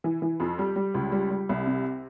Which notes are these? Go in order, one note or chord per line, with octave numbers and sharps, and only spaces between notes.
E3
E3
F2
G3
G3
C#2
G3
G3
C2
C3